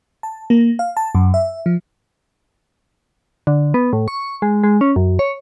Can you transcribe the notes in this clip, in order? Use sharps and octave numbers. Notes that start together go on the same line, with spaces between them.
A5
A#3
F5
A5
F#2
E5
F3
D3
B3
A2
C#6
G#3
G#3
C#4
F#2
C#5